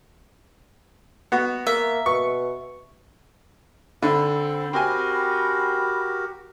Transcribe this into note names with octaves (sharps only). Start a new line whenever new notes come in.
B3 F#4
A#3 E5
B2 C#6
D3 C4 C5 B5
C4 F#4 G4 A#4 G#5